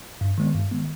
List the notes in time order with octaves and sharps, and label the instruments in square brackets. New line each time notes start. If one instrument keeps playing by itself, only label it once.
[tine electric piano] G2
D#3 G#3 B3
G2
D#3 G#3 B3